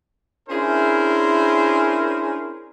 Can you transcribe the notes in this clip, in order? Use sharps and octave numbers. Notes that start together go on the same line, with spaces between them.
C#4 D4 E4 G#4 A#4 C5